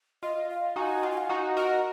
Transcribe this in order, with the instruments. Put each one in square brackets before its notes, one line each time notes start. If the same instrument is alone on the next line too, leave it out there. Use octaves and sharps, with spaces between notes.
[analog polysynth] F4 [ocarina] D#5
[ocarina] F5
[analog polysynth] D#4 F#4 [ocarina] G#5
[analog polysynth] F4 [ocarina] F#5
[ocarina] G#5
F#5
[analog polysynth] D#4 F#4
[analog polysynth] F#4 A#4 [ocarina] D#5